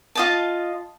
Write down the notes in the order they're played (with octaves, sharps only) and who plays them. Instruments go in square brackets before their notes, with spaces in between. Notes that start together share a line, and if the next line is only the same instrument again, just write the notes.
[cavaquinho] F4 D#5 A5